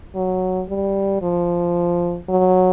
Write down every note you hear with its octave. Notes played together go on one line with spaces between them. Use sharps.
F#3
G3
F3
F#3